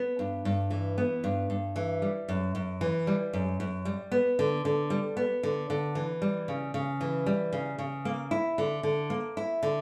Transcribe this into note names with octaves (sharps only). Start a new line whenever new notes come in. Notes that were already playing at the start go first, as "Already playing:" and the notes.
Already playing: B3
G2
G2
E3
B3
G2
G2
E3
G3
F#2
F#2
E3
G3
F#2
F#2
G3
B3
D3
D3
G3
B3
D3
D3
E3
G3
C#3
C#3
E3
G3
C#3
C#3
A#3
E4
D3
D3
A#3
E4
D3